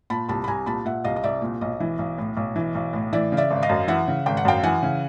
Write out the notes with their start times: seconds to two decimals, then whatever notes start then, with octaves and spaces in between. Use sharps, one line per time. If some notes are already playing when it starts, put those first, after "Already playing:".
0.10 A#2 A5 B5
0.28 C2 A5 B5
0.44 B5
0.48 C2 G#5 A#5
0.66 A#2 A5 B5
0.85 A#2 E5 F#5
1.04 C2 D#5 F5
1.16 D#5
1.23 C2 D5 E5
1.42 A#2
1.61 B1 D#5
1.80 E3
1.99 B1
2.18 A2
2.37 B1
2.56 E3
2.75 B1
2.93 A2
3.13 E3 D5 E5
3.32 C#3
3.37 D5 E5
3.51 G#1
3.63 D#5 F5
3.69 F#2
3.88 E3 E5 F#5
4.08 C#3
4.26 G#1 G5
4.37 F#5
4.45 F#2 F5 G5
4.63 E3 F#5 G#5
4.83 C#3